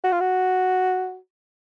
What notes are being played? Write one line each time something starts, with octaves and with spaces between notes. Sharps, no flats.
F#4
F4
F#4